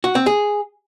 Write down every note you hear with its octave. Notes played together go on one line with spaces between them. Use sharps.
F#4
C4
G#4